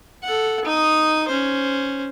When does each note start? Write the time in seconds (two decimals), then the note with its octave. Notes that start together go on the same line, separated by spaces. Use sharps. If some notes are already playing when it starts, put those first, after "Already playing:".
0.23 A4 F#5
0.65 D#4 D#6
1.28 C#4 C5